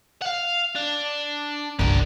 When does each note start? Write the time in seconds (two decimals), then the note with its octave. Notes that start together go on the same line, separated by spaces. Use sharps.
0.22 F5 F#5
0.76 D4
1.79 G1 C2 D4 A#4